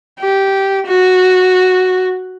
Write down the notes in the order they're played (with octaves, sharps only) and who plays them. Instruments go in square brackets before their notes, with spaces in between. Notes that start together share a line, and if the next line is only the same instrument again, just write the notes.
[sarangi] G4
F#4